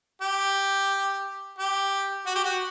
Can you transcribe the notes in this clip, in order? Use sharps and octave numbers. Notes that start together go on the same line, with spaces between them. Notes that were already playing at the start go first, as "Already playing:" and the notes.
G4
G4
F#4
G4
F#4